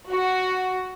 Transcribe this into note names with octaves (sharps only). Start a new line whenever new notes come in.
F#4